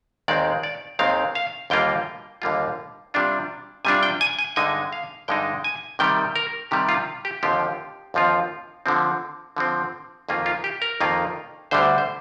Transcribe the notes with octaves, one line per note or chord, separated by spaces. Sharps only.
D#2 D#3 G#3 C4 D5
D5
D#2 D#3 G#3 C4 F5
F5
D#2 D3 G3 A#3 F4 G5
D#2 D3 G3 A#3 F4
C3 G3 D4 F4
C3 G3 D4 F4 G#5
G5
G#5
G#5
G2 D3 G#3 D#4 G#5
F5
G2 D3 G#3 D#4 G5
G#5
C3 D#3 G3 G5
A#4
C3 D#3 G3 G4
F4
G4
D#2 D3 F3 C4 F4 G4
D#2 D3 F3 C4 F4
D3 F3 C4
D3 F3 C4
F2 D#3 A#3 F4 G#4
F4
G4
A#4
F2 D#3 A#3 F4
D2 D3 G3 C5
C5